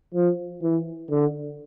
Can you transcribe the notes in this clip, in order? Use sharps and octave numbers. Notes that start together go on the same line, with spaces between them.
F3
E3
D3